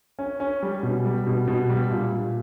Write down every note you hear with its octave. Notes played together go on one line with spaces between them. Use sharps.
C#4
C#4
G3
B2
G3
B2
B2
G3
A#2
A#2